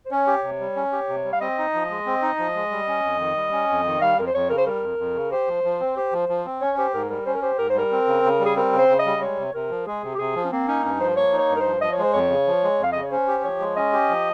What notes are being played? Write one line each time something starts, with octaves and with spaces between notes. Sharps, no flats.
C5
C#4 C#5
G4
C3
G3
C#4
G4
C3
G3
F5
C4 D#5
D#4
F3
G#3
C4
D#4
F3
G#3
G3
C#4
F2
D#3
G3
C#4
F2
D#3
G3 F5
F2 A#4
C5
F2 C#5
C#3 A#4
C5
G3 A#4
F2
F2
C#3
G4 C5
F3
F3
C4
G4 C5
F3
F3
C4
C#4 C#5
G4 C5
G#2 A#4
G3 A#4
C#4 C5
A#4
G4 C5
G#2 A#4
C5
G3 A#4
C4
C#3
C#3
G3
G#4
C4 A#4
C#3
C5
C#3
D#5
G3
G#3 C#5
C3
C3 A#4
F3
G#3 G#4
C3
G4
C3 G#4
F3
C#4
A#3 C4
C#4 D#4
G2 C#4
F3 C5
A#3 C#5
D#4
C#5
G2
A#4
C5
F3
F3 D#5
C#5
G#3 C5
F2 C#5
C#3
F3
G#3
F2 F5
C#3 D#5
C#5
C#4 C5
G4
F3 C#5
G#3
C#4 D#5
G4
F3